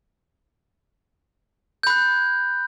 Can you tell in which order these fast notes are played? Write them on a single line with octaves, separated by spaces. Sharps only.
G6 B5 F#6